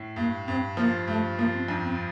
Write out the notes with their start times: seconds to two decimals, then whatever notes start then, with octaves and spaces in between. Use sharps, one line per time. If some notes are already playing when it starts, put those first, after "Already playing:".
Already playing: A2
0.16 G2 A#3
0.47 G2 C4
0.77 F3 A#3
1.08 G2 A3
1.39 F3 A#3
1.54 C4
1.68 F2 D4
1.85 C4